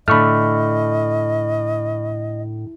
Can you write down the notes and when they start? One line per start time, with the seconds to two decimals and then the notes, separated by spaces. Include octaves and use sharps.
0.08 A2 D3 A3 D#5 B5 C#6 F6